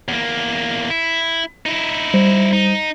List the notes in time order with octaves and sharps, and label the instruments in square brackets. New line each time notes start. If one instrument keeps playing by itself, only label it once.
[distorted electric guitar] E2 A#3
E4
D#4 E4
[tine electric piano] G3 C5
[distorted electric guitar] D#4